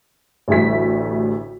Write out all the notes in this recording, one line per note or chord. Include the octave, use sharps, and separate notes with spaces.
A1 D2 G3 A3 B6